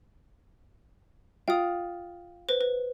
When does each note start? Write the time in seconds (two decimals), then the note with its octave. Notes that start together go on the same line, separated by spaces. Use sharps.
1.48 F4 F5 G5 D#6
2.49 B4 C5
2.61 B4